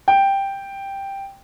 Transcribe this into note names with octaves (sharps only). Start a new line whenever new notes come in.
G5